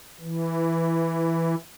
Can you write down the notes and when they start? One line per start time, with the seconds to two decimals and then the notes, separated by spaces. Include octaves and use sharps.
0.21 E3